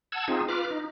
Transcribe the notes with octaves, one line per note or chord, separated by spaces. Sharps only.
F#5 A5 E6 G#6
C4 D#4 F4 G#4
F4 B4 D6 F6
D#4